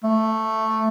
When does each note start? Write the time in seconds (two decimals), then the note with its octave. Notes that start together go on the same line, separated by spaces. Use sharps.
0.03 A3